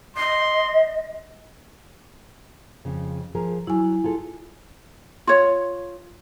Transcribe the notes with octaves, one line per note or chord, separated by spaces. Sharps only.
D#5 C6
F2 C#3
F3 G#4 A#4
F#3 E4 G#5
F4 G#4 A4
F4 C#5